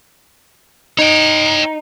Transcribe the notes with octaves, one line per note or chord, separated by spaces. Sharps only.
D#4 C#5 G5